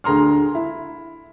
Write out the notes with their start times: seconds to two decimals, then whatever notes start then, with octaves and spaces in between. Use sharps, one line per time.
0.04 D2 G#4 A#5 C6 F6
0.55 E4